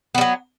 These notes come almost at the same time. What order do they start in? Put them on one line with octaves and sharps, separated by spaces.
B3 G3 F#3